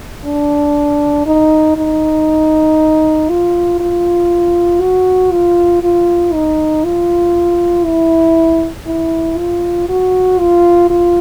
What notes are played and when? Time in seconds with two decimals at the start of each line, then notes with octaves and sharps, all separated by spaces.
0.25 D4
1.26 D#4
1.77 D#4
3.29 F4
3.80 F4
4.81 F#4
5.32 F4
5.83 F4
6.34 D#4
6.84 F4
7.85 E4
8.87 E4
9.38 F4
9.89 F#4
10.40 F4
10.90 F4